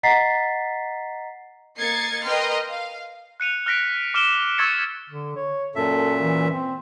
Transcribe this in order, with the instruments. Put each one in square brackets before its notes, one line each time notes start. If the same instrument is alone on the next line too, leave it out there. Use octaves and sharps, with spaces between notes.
[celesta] D#5 F#5 A#5 A6 B6 C7
[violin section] A#3 D#5 G#6 A6 C7 C#7
A#4 B4 D#5 G5 C6 F6
F5
[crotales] F#6 C#7 D#7 F7
F6 F#6 A#6 B6 D7
D6 F6 D7 E7 G7
C#6 E6 G#6 A6 B6 C#7
[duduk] D3
C#5
[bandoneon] F#2 A#2 E5 [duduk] A4
[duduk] E3
C4